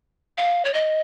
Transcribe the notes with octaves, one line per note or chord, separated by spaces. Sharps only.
F5
C#5
D#5